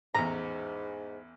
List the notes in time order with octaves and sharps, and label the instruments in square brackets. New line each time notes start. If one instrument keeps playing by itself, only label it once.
[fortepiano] A1 E2 [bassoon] G#2 [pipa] A#5